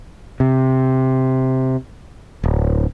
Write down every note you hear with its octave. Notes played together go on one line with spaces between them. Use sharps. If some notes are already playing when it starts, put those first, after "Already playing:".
C3
D1